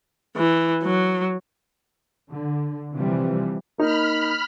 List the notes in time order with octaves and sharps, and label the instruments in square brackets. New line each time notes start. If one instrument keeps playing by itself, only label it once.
[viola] E3
F#3
[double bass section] D3
C3 E3 F3 G3
[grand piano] A#3 D#4 [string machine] B5 F6